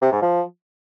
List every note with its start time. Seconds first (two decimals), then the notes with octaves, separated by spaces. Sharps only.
0.02 C3
0.12 G#2
0.22 F3